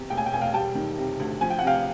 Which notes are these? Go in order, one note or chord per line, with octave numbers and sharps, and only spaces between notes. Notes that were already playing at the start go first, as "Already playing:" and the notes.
Already playing: E2 C3
E1 G5
G#5
G5
E1 G#5
F5 G5
G3 G5 A5
D#3
C3
D2
F3 G#5
G5
F#5
C3 F5 G5